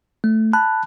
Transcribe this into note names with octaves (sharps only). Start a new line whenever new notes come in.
A3
A5 B5 F#6